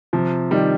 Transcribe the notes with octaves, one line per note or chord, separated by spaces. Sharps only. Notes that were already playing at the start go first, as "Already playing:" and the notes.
C3 F3
D#3 G3